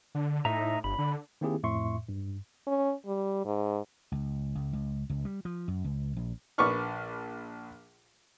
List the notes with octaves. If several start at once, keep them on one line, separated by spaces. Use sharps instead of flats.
D3
A2 D#4 E5 A#5
G1 B5
D3
D#3 A#3 C4 E4 G4 G#4
F2 A2 E5 C6 C#6
G2
C#4
G3
G#2
C#2
C#2
C#2
C#2
G3
F3
F#2
C#2
A#1
A#1 B4 C#6 D6 F6